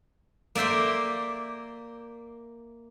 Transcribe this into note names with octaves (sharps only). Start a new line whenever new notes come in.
A#3 D5 E5 G5 C6